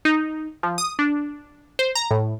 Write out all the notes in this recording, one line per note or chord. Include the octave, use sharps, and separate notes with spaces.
D#4
F3
D#6
D4
C5
A#5
A2